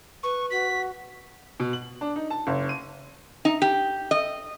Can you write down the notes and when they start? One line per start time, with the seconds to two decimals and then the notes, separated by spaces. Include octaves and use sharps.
0.23 B4 C#6
0.51 F#4 B6
1.60 B2
1.73 F#7
2.01 D4
2.16 D#4
2.30 A5
2.47 F#1
2.69 D#7
3.45 D#4
3.62 G4
4.11 D#5